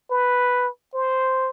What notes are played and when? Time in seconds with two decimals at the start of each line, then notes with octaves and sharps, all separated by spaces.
0.10 B4
0.94 C5